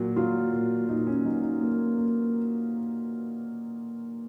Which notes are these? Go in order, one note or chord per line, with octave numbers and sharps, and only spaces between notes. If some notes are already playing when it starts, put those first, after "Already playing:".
Already playing: A#2 F#3
F#3 F4
A#2
A#2 D#4
C#4
F#3 D#4
D#4
A#3
A#3